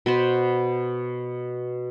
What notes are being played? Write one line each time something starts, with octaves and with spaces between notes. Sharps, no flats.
B2 B3 C5